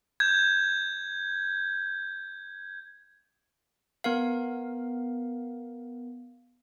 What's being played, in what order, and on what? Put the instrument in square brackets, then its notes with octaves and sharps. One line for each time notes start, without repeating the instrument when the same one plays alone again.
[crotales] G6 G#6
[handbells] B3 A#4 F5